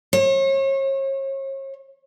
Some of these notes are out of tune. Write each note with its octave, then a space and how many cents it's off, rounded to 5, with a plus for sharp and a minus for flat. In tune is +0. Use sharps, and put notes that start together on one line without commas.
C#5 -40